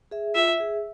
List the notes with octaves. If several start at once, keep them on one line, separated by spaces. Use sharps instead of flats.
G#4 E5
F4 E5
G#4 E5